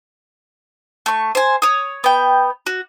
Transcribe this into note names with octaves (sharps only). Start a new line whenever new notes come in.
A3 C#6
C5 G#5
C#5 D#6
B3 G5
F#4